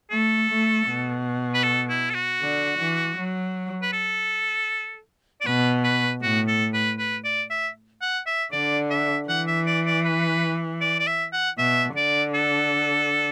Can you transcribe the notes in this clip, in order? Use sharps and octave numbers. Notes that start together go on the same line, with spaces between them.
A3 A4
A3
B2
B4
A4
E4
A4
F#4
D3
E3
F#3
B4
A4
D5
B2 B4
B4
A2 F#4
A4
B4
B4
D5
E5
F#5
E5
D3 D5
E5
E3 F#5
E5
D5
D5
B4
D5
D5
E5
F#5
B2 E5
D3 D5
A4